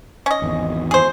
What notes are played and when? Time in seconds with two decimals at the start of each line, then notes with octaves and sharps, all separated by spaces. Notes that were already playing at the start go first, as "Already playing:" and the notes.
0.26 C#4 D#5
0.42 G#1 E2
0.91 G#4 C5